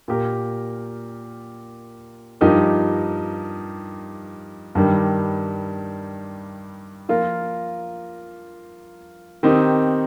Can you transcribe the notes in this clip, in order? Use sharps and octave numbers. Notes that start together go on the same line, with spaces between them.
A#2 A#3 G4 A#4
G2 F3 D#4 G4 A#4
G2 D#3 G3
F3 A#3 F4 A#4
D#3 C4 D#4 G4